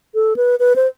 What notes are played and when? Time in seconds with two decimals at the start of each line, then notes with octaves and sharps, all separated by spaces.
0.15 A4
0.36 B4
0.60 B4
0.76 C5